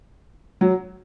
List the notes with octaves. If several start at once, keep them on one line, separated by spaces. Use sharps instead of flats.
F#3